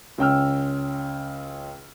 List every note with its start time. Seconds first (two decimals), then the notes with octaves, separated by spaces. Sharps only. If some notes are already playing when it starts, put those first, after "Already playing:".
0.18 C#2 C#4 G5 E6 F6